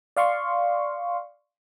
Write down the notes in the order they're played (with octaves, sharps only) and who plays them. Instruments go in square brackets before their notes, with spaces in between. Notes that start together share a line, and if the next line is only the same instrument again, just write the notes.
[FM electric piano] D5 F5 C6 C#6